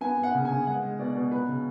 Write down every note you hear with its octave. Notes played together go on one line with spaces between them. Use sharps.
B3 G#5
B3
F#5
C#3
C#3 G#5
G#3 F#5
G#3
B2 D5
B2
F#3 B4
C#3